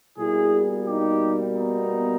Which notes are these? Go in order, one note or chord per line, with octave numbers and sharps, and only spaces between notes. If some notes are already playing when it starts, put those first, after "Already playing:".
B2 G3 A#3 E4 G#4
D#4 G4
B3 D#4